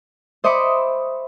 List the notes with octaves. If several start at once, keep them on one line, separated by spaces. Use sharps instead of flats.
C5 D#5 E5 B5 C#6 D6